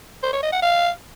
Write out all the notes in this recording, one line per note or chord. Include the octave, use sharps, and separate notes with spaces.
C5
C#5
D#5
F#5
F5